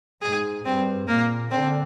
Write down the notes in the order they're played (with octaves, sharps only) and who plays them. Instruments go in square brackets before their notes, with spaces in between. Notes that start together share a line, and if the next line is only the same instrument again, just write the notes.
[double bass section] G#2 [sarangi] G#4
[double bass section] G2 [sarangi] C4
[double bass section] A#2 [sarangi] A#3
[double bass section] D3 [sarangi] C4